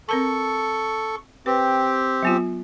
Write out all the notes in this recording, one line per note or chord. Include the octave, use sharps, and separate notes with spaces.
C4 A4 A#4 A5 C#6
C4 G4 B4
F#3 B3 F4